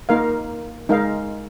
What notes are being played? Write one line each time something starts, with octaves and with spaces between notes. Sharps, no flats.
A#3 D#4 A#4 F5
G#3 D#4 A#4 F5